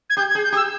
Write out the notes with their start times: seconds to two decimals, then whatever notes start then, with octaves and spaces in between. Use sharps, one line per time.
0.10 G#6
0.17 G4 G6
0.30 G#6
0.35 G#4
0.44 G6
0.52 G4
0.56 E6